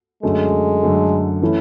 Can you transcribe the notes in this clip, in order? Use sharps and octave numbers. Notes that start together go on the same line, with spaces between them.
F#2 D3 F#3 G#3 A3
F#2 D3 F#3 A3
E3 A3 C#4 E4